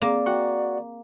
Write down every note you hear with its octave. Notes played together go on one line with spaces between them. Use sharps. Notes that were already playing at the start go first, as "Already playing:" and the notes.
A#3 C4 G#4 A#4 D5
F#4 F#5 G5 C#6